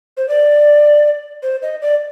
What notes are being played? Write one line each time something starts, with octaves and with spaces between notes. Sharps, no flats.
C5
D5
C5
D#5
D5